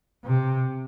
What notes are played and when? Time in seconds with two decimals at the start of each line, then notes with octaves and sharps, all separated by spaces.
0.24 C3